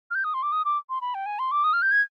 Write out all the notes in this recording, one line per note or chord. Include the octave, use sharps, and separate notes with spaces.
F6
G6
D#6
C6
D6
D#6
D6
C6
B5
G5
G#5
C6
D6
D#6
F6
G6
G#6